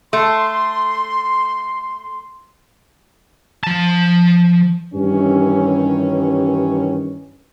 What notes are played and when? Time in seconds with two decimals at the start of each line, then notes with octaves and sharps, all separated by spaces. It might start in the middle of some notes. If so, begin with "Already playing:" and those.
0.13 A3 C6
3.63 F3 A5
4.94 G2 D#3 E3 C#4